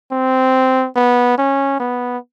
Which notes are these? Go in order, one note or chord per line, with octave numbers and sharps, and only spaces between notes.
C4
B3
C#4
B3